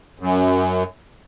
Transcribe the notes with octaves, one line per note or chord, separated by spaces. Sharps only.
F#2